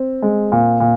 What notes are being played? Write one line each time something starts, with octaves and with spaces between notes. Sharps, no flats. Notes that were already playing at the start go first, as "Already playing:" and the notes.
Already playing: C4
G#3
A#2
A#2